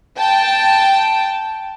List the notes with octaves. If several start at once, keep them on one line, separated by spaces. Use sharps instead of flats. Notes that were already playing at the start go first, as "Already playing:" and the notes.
G5 A5